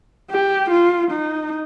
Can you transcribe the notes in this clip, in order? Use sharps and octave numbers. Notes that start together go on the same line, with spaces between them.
G4
F4
D#4